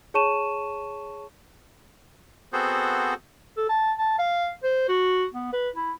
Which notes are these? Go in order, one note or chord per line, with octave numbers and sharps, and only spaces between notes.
G#4 C#5 A5 C#6 D#7 E7
B3 C4 F#4 G#4 A4 C5
A4
A5
A5
F5
C5
F#4
B3
B4
E4